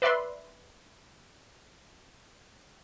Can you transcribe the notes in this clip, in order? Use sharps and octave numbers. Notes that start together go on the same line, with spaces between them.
B4 D5 E5 B5 C6